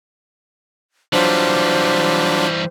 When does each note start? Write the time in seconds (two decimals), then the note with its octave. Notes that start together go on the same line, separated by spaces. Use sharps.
1.13 E3 F#3 G3 D4 F4 C5